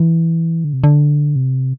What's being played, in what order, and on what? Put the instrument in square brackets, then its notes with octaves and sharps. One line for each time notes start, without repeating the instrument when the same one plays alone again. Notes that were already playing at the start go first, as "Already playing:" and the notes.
Already playing: [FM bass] E3
D3
C3
D3
C3